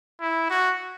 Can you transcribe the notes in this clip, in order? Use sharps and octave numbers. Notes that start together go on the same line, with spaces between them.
E4
F#4